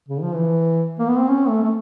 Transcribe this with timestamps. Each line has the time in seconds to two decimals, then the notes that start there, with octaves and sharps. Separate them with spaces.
0.09 C#3
0.22 F3
0.35 E3
0.99 A#3
1.09 B3
1.19 C4
1.29 C#4
1.49 A3
1.64 A3